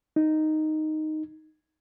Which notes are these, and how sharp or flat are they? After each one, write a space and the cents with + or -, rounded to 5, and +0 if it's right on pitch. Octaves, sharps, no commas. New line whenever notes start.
D#4 -5